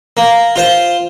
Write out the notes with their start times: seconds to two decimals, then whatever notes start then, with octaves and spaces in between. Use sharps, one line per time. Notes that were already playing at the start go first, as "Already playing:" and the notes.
0.17 A#3
0.56 F4 C5